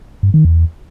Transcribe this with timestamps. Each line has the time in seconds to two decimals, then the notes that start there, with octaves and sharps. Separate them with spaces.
0.23 G2
0.34 D#3
0.45 E2